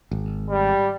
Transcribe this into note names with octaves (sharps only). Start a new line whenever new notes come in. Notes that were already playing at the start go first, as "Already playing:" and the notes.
G#1
G3